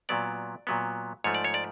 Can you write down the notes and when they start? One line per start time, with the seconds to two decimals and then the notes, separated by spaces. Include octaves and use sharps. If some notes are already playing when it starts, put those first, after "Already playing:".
0.09 A#2 F#3 B3 D5
0.67 A#2 F#3 B3
1.24 G#2 F3 A3 C#5
1.34 D5
1.44 C#5
1.54 D5